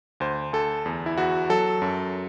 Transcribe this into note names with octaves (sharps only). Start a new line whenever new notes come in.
D2 C5
D2 A4
E2
E4
E2 F#4
F#3 A4
F#2